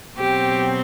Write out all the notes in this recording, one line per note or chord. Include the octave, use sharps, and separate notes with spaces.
B2 F#3 C4 G4